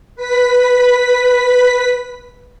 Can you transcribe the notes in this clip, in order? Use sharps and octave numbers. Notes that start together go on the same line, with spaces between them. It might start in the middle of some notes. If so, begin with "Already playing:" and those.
B4 B6